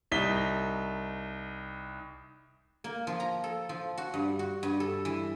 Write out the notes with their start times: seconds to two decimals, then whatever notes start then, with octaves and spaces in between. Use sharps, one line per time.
0.11 C2 D#4 B6 G7
2.84 A#3
3.07 F3
3.20 A#5
3.44 A4
3.69 F3
3.97 F#4
4.14 G2
4.39 F#4
4.63 G2
4.80 A4
5.05 E3